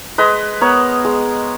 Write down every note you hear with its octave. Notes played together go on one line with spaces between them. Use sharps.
G#3 B4 D#5
B3 A#4 C#5
G#3 G#4